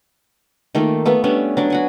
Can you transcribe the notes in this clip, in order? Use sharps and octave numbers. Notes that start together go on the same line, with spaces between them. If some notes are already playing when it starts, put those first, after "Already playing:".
D#3 A3 A#3 F4
A3 B3 F4 E5
G3 B3 C#4 D4
F#3 D4 D5
F#4 F#5 G#5